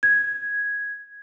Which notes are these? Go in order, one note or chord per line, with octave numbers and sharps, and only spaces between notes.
G#6